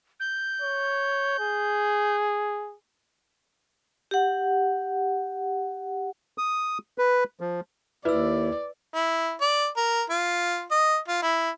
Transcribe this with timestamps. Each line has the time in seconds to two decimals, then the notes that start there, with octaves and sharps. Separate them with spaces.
0.20 G6
0.62 C#5
1.40 G#4
4.11 G4 F#5
6.38 D#6
6.98 B4
7.40 F3
8.05 D#2 E4 B4 D5 E6
8.94 E4
9.41 D5
9.77 A#4
10.10 F4
10.71 D#5
11.08 F4
11.22 E4